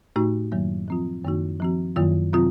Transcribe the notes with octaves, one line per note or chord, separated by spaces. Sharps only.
A2 A3 D#4 F#4
F#2 D#3 F#3 A#3
F3 C4 F4
F#2 D#3 A#3 D#4 F#4
F3 C4 F#4
F#2 D#3 F#3 A#3 F4
C3 F#3 C4 F4